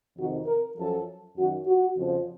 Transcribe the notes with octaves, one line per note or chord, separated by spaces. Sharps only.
F2 C3 D#3 F#4
A#4
F#2 F3 A4
F#2 D#3 F#4
F#4
F2 C#3 F3